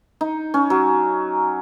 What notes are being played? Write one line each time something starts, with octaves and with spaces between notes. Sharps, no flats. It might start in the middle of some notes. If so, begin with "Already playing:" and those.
D#4
C#4
F#3